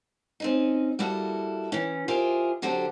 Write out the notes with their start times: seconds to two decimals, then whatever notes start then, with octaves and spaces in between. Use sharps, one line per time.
0.40 C4 C#4 D#4
0.99 G3 A#3 E4 F#4 A4
1.72 E3 C#4
2.08 F4 G4 G#4 A#4 C5 E5
2.62 D3 F#3 F#4 G4 A4 C5